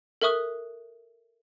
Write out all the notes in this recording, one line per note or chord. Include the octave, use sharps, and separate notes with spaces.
A4 A#4 E5 C#6 D#6 F#6